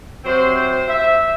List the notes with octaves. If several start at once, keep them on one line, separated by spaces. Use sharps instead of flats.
C3 F#3 C4 C5
C5
E5